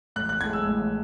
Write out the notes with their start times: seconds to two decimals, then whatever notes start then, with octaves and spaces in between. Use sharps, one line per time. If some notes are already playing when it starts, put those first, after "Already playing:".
0.16 A1 F#6
0.29 F#6
0.41 A2 G#3 G#6
0.53 E6
0.67 A1